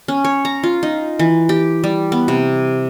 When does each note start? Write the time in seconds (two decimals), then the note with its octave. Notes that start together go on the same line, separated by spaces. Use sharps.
0.08 C#4
0.24 C#5
0.45 A#5
0.63 F4
0.83 D#4
1.19 E3
1.49 G4
1.84 G3
2.12 B3
2.28 C3